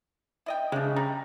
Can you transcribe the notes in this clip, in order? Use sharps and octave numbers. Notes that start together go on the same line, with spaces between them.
E4 D#5 G5
C#3 G#3 D4
G3 A#5